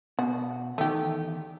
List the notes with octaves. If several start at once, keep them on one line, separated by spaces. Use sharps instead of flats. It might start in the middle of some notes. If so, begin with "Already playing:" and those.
B2 F#4
E2 D#3 A3 G4